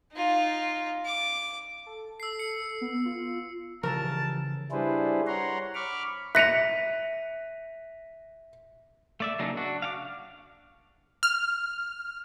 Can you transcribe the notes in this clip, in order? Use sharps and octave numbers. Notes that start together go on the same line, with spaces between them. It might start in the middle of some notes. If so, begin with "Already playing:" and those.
D#4 F4
D6
A4
E6 C7
C#7
B3
F4
C#3 E3 F3 G3 A#4 A5 A#5 E6
G3 D4 E4 G#4 B4 C5
C#5 F#5 A#5 C6
B5 C#6 D6 F6
E5 F#6 A#6 B6 C#7 D#7 F7
A3 D5 E5
C#3 F#3 A#3 D4 D#4
D4 F#4
F5 F#5 D6
F6